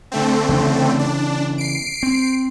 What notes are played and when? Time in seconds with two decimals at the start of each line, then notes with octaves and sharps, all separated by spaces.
0.12 D3 A3 C4
0.49 C#3 E3 B3
0.99 D4
1.58 C7 D7
2.03 C4